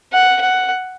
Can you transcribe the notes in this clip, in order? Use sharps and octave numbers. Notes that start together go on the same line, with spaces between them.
F#5
F#5